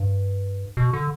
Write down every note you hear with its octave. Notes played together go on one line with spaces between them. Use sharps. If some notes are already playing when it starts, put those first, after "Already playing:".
Already playing: G2
B2
D3